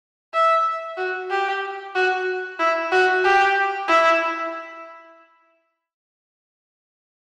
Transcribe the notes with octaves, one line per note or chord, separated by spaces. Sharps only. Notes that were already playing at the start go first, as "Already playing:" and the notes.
E5
F#4
G4
F#4
E4
F#4
G4
E4